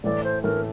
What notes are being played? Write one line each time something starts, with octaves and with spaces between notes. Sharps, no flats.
A2 E3 A3 D5
C5
A2 E3 A3 A#4